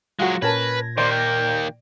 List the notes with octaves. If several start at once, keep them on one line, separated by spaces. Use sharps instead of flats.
F#3 G#3 F4 F#4
A#2 C#4 A#4 B4 A5 G#6 A#6
D#3 A#3 C5 D5
G5